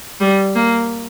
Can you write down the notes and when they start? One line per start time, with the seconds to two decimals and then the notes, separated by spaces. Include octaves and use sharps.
0.20 G3
0.55 A#3